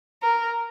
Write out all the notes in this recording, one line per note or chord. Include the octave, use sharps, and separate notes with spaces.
A#4